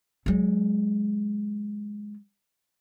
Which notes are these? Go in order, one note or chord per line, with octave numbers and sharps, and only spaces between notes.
F#3 G#3